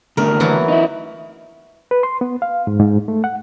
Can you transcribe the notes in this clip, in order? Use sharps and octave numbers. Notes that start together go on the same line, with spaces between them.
D3 A3 A#3 A#4
E3 F#3 B3
D#4 E4
B4
C6
B3
F5
G#2
G#2
A3
F#5